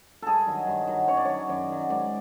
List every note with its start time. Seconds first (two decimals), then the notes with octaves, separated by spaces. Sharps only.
0.22 G2 G#4 A4
0.47 D#3 F#3
0.67 G2
0.87 D#3 F#3
1.08 F#2 C#5
1.17 D5
1.25 D#3 F#3 C#5
1.49 F#2 D5
1.69 D#3 F#3
1.89 G#2 D5